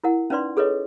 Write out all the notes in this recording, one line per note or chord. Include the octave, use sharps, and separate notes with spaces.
E4 A#4 F#5
C#4 D#4 B4 D5 C6
G#4 A4 B4 C#5 D#5